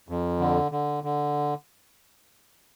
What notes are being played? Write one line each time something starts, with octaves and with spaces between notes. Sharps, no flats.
F2
D3
D3
D3